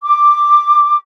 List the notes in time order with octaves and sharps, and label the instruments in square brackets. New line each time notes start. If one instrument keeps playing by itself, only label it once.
[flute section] D6